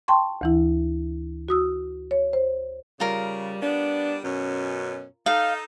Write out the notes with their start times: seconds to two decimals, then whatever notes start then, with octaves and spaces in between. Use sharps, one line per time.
0.08 G5 A5 C6 C#6
0.41 D2 E3 E4
1.49 F#4 D#6 E6
2.11 C#5
2.33 C5
3.00 C#3 G3 F4 A#4
3.61 G3 B3 D4
4.23 F#2 B2 C#4
5.26 D#4 A4 F5